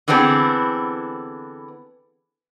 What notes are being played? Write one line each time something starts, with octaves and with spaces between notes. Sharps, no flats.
D3 E3 B3 C4 D4 G#4